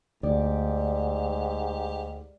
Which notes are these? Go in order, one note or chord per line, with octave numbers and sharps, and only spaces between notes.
D2 G#2 G4 D5